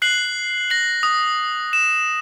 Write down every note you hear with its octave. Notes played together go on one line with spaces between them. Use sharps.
F#6 C7 F#7
A#6 C7 F#7
D#6
E7